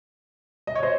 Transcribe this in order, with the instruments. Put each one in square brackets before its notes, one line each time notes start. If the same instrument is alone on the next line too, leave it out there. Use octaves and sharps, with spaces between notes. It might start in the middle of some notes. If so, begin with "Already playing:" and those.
[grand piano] D#5
C#5
C5 D#5